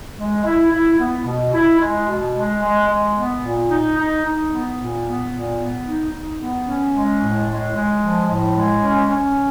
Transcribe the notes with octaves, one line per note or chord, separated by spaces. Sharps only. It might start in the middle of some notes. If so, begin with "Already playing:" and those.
G#3
E4
E4
B3
B2
E4
G#3
B2
G#3
G#3
G#3
B3
A#2
D#4
D#4
D#4
B3
A#2
B3
A#2
B3
D#4
D#4
B3
C#4
G#3
A2
G#3
G#3
F3
A2
G#3
C#4
C#4